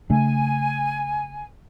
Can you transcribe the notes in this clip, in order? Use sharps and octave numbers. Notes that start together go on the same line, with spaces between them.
C#3 A3 D4 G#5